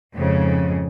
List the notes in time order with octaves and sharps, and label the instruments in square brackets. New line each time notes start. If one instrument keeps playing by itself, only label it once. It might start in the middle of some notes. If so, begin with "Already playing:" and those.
[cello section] F2 G#2 C#3